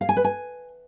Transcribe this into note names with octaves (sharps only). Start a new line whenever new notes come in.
F5
G#5
B4
G#5